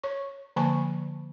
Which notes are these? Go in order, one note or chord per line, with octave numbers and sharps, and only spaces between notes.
C#5 C#6
D3 F3 A#3 G#5 A5 C#6